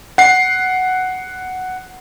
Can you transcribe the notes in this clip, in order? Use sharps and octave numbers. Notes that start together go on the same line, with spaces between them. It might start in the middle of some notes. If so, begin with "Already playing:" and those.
F#5 C7